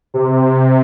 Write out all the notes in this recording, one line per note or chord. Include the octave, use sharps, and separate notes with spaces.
C3